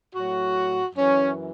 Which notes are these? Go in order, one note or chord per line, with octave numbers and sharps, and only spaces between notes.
A2 F#3 F#4
F#2 E3 C#4